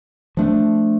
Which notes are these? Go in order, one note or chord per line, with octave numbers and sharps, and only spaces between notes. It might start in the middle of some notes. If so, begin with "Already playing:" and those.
F3 A3 D4